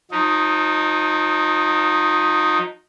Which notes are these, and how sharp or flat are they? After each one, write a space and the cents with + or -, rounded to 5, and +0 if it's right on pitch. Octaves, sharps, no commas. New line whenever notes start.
F3 +45 D#4 +0